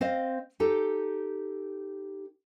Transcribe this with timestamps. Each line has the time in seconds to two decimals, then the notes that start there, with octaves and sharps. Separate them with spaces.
0.01 C4 C5 D#5 F5
0.60 D#4 G4 A4